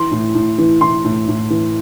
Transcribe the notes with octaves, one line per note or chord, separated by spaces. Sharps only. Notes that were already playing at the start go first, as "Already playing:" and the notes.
Already playing: E3 C6
A2
A2
E3
E3 C6
A2
A2
E3